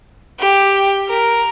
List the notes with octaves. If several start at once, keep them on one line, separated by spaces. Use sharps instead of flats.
G4
A#4